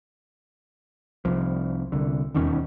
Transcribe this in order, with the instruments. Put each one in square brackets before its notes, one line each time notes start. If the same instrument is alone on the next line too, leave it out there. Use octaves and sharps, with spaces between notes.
[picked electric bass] C2 F3
C2 D3
E1 D#2 D#3 C#4